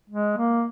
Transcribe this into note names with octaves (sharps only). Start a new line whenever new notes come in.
G#3
A#3